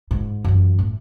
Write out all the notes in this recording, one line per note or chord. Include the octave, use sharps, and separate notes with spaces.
G#2
F#2 E3
A2